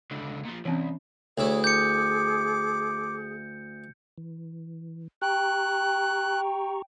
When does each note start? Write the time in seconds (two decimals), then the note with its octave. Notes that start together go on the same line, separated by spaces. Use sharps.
0.11 C#2 D3
0.45 A#2 F3
0.65 C2 E3 C4 C#4
1.38 D2 E4 G#4 C#5
1.64 D6 G6 C#7
4.18 E3
5.22 G4 G5 A#5 C#6 F#6